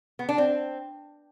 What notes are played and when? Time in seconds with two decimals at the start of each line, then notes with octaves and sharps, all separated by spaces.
0.19 B3
0.29 D4
0.38 C4